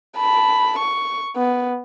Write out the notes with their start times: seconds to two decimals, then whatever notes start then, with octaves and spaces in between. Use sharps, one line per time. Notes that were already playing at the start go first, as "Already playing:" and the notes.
0.18 A5 B5
0.79 C#6
1.36 B3